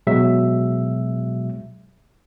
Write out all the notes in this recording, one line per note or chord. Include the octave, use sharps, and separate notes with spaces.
B2 F#3 G#3 E5